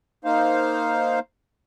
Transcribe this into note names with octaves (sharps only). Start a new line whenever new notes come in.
A#3 D#4 C5 F5